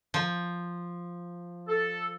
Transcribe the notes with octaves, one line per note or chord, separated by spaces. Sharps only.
F3
A4